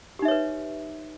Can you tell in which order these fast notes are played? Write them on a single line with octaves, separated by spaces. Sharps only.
G4 D#4 E5 C#5 B4